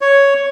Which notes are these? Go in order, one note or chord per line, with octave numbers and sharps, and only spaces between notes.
C#5